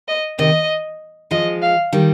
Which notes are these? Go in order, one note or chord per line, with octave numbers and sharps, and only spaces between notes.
D#5
C3 D#3 D#5
F3 G#3 D#5
F5
D#3 G3